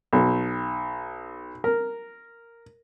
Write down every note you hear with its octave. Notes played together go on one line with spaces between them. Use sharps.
B1
A#4